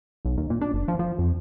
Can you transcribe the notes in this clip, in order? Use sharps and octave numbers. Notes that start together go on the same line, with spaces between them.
B1
D#2
A#2
D4
F#1
F3
F3
F2